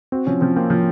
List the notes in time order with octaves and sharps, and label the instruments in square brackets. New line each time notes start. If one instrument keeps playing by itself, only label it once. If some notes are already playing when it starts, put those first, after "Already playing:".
[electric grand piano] C4 [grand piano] F#4
[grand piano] F3 [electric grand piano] C#4
[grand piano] F3 [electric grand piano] C4
[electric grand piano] A#3 [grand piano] C4
[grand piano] F3